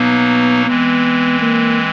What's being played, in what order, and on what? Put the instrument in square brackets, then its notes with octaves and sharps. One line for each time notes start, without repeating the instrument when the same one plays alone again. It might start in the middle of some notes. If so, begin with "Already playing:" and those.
Already playing: [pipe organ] B2 F#3 A#3 D#4 [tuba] B3
[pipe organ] E3 G#3 C4 [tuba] B3
[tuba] A#3